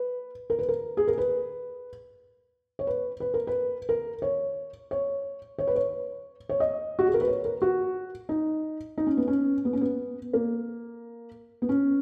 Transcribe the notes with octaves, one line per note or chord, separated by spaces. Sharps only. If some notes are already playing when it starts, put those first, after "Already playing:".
Already playing: B4
A#4
B4
A#4
G#4
A#4
B4
C#5
B4
B4
A#4
B4
A#4
C#5
C#5
C#5
B4
C#5
C#5
D#5
F#4
G#4
A#4
B4
C#5
A#4
F#4
D#4
D#4
C#4
B3
C#4
B3
C#4
B3
A#3
B3
C#4